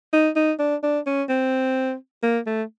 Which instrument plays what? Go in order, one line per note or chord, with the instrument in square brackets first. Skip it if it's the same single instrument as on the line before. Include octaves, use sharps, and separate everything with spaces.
[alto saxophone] D#4
D#4
D4
D4
C#4
C4
A#3
A3